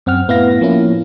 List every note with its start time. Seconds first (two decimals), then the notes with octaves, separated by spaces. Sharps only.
0.06 F#2 C4 F#5 F6
0.28 A2 B3 E4 F5 A#6
0.61 F3 A#3 C#4 E4